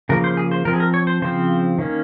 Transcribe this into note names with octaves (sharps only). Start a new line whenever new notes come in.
C#3 F3 A#3 A#4
C5
G#4
C5
F3 C4 A#4
G#4
A#4
C#5
C5
C#3 F3 C4 C5
D#3 A#3 C#4